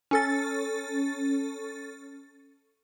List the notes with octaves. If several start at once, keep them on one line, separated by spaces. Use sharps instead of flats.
C#4 A4 A6